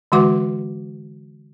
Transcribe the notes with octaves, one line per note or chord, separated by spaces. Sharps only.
D3 E3 G#3 F#4 F#5 D6